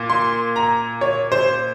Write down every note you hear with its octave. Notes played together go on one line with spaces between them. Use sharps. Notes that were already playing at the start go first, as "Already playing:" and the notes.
Already playing: A#2
C6
A#5
C#5
C5